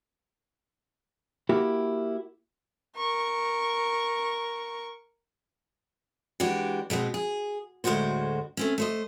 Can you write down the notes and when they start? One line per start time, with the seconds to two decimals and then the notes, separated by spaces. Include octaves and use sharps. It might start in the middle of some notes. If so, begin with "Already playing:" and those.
1.49 A#3 E4 F#4 G4
2.97 A#4 C#6
6.40 E3 G#3 D4 F#4 G4
6.90 B2 G#3 B3 C4
7.14 G#4
7.84 D2 A2 G#3 F#4 C5
8.57 A3 C4 C#4
8.78 A3 C5 D#5